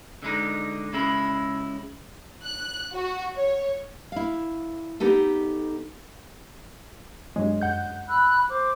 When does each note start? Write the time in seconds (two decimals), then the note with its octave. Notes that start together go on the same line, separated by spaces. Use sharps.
0.22 D3 G#3 D#4
0.93 C#3 G#3 E4
2.44 F#6
2.94 F#4
3.36 C#5
4.12 E4 F5
5.00 B3 D#4 G4 A4
7.36 G2 F#3 G#3
7.61 F#2 F#5 G6
8.08 B5 E6 F#6
8.48 C5 D6